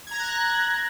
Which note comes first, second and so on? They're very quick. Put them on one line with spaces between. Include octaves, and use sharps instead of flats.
G#6 A#5 A#6 F#6